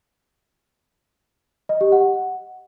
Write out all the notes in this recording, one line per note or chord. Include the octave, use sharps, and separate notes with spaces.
D#5
G4
F#5